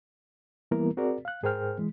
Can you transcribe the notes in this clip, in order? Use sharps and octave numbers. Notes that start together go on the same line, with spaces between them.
E3 G3 A#3 B3 E4 A#4
C4 F#4 G#4 A#4 D5
F5 F#6
G#2 G#4 A#4 C5 G5 F6
E3 G#3